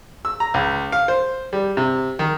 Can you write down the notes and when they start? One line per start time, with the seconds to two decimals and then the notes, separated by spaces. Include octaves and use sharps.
0.25 E6
0.40 A#5
0.54 C#2
0.92 F5
1.08 C5
1.53 G3
1.77 C3
2.19 D#3